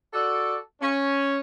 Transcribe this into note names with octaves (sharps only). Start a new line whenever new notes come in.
F#4 A4 D5
C#4